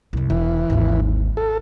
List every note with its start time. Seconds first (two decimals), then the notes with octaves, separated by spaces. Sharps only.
0.13 C2 F#2
0.30 E1 E3
0.70 G#1 D#2
1.37 A4